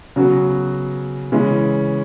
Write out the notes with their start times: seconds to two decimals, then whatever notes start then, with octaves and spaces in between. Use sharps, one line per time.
0.16 C#3 F#3 B3 F#4
1.32 C#3 E3 G#3 C#4 E4